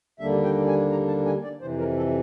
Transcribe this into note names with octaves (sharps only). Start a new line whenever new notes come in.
D#2 D3 G3 A#3 D4 E5
G5
G#5
A#5
A5
G#5
D5
F2 C3 E3 C5
A#4
A4